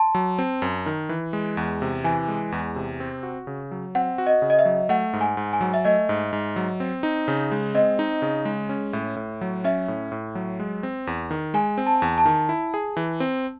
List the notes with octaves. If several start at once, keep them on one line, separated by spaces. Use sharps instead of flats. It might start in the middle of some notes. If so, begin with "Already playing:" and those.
Already playing: A5 C6
F#3
C4
F#2
D#3
E3
G#3
E2
C3
E3 G#5
G#3
E2
C3
C4
F#4
C#3
F#3
C4 F#5
F#4
D#5
C#3
D#5
E5
F#3
A3 F#5
G#2
G#5
G#2
G#5
F#3
E5
A3 D#5
G#2
G#2
F#3
C4
D#4
C#3
G#3
C4 D#5
D#4
C#3
G#3
C#4
A2
A2
F#3
C#4 E5
A2
A2
F#3
G#3
C4
E2
D#3
G#3 G#5
C4
A5
E2
A5
D#3
E4
G#4
E3
C4